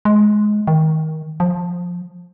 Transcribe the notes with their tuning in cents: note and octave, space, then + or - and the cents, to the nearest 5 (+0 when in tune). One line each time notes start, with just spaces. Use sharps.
G#3 +15
D#3 +20
F3 +15